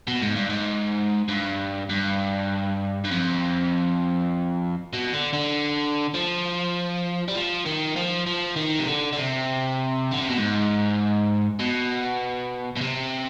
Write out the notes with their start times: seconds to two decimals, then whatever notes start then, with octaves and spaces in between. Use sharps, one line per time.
0.08 B2
0.22 G#2
0.35 G2
0.49 G#2
1.29 G2
1.90 G2
3.04 G2
3.11 F2
4.93 B2
5.13 D3
5.33 D3
6.14 F3
7.28 G3
7.35 F3
7.66 D#3
7.96 F3
8.26 F3
8.56 D#3
8.79 C3
8.87 D3
9.13 D3
9.17 C3
10.12 D3
10.21 C3
10.30 B2
10.38 G#2
11.60 B2
12.77 B2
12.81 C3